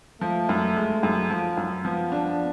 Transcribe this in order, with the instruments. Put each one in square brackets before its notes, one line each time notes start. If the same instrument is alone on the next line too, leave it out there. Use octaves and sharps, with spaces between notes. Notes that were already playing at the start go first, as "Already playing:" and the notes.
[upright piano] F3 [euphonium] A3
[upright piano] F#2
G#3
F#2
F3
F#2
[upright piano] F3 [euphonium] B3
[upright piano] D4